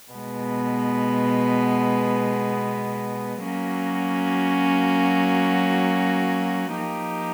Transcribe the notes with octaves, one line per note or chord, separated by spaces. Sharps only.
B2 G#3 B3
F#3 A#3 C#4 F#4
F3 A#3 D#4 G4